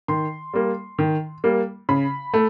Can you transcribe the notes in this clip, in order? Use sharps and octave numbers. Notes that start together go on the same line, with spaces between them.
D#3 C6
G3 A#3
D#3
G3 A#3
C#3 B5
A3